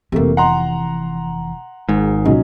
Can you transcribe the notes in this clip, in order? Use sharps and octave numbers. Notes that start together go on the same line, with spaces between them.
F1 C3 E3 A3 A#3
F#5 A#5 C6
G#1 G#2
C2 A#2 F#3 C#4 D#4